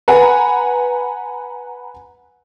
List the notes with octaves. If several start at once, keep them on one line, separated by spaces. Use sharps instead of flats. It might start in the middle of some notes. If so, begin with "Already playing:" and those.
B4 F#5 G#5 A#5 B5